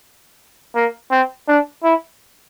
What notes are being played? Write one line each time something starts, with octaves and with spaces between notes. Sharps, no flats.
A#3
C4
D4
E4